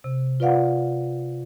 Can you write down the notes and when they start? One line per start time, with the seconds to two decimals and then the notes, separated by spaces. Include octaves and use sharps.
0.04 C3
0.40 F4 B4 D5 F5 F#5